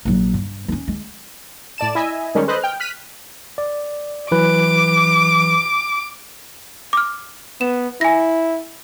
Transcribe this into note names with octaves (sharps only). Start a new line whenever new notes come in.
A#1 F#3
G2
C4 C#4
G#3
A2 D5 A5 E7
E4 D#5 E5 G#5
D#3 G3 G#3 C#4
A4 B4 C5 D#5 F#6
G5 F6
F6 F#6 B6 D#7
D5
E3 F#3 B4 D6
D6 F6
B3 E7
E4 G#5 A#6